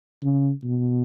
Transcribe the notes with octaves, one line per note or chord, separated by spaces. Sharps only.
C#3
B2